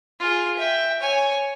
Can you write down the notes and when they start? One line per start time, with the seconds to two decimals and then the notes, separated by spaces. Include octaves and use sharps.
0.20 F4 G#4
0.56 E5 G5
1.00 C#5 G#5